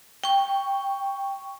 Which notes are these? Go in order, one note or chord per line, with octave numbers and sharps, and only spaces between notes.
G5 C#6